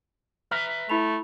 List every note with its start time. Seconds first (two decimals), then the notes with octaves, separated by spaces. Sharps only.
0.51 B4 E5 A#5 F6
0.89 A3 E4 B5 F7